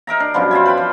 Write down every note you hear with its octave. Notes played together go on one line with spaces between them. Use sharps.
D#4 A#4 E5 A#5
D4
F#2 B2 F3 G3
C5 D5 E5 G#5
B4 C5 G5 B5
F3